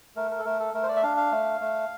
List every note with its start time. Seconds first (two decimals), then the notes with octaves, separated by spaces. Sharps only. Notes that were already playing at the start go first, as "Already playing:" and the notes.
0.16 A3 A#4
0.31 A#4
0.39 A4
0.45 A3 A#4
0.60 A4
0.74 A3 A#4
0.83 C5
0.89 D5
0.96 E5
1.03 D4 F5
1.17 F5
1.31 A3
1.60 A3